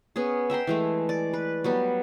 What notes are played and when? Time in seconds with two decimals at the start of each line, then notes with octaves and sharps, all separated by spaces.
0.16 B3 C#4 G#4
0.50 E5 G5 A#5 C6
0.67 E3 G#3 A3
1.09 D5
1.33 B4
1.64 F#3 G3 B3